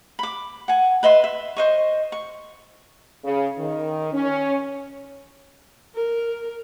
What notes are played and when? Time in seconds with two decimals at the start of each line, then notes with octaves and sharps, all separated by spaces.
0.19 B5 D6
0.68 F#5 G#5
1.03 B4 D#5 E5 C6
1.24 E5
1.56 C5 D#5 C#6
2.12 C#6
3.24 C#3
3.58 D#3
4.12 C#4
5.96 A#4